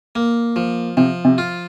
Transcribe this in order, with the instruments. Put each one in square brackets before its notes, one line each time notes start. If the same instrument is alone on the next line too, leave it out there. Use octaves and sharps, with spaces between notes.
[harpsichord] A#3
F3
[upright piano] C3 [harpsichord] F3
[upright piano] C3
[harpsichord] F4